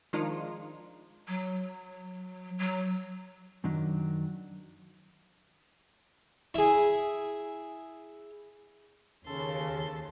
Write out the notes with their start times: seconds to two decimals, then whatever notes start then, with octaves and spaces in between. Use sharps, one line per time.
0.13 D#3 F3 G#3 D4 D#4 F4
1.28 F#3
2.59 F#3
3.64 F#2 D#3 F#3 D4
6.54 E4 G#4
9.27 D#2 C#3 A4 C6